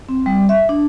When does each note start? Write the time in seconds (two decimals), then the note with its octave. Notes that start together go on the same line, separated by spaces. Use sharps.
0.09 C4
0.26 G3
0.49 E5
0.69 D4